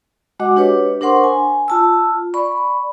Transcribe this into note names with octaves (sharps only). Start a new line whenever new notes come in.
G#3 F#4 D#5 F#5 D6
D4 G4 B4 C#5
D4 A#4 C5 F#5 C6 C#6
G#5
F4 A5 E6
D5 B5 C#6